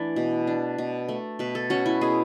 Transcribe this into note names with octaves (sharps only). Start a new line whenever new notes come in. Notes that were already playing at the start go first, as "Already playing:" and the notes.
Already playing: E3 A3 D4 D5
B2
D4
B2
A3
B2 B4
A4
C#4 F#4
E4
B2 G#4